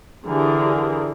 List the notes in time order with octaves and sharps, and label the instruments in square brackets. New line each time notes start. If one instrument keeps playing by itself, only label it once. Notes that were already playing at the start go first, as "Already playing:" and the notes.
[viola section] D3 E3 G4 G#4 A#4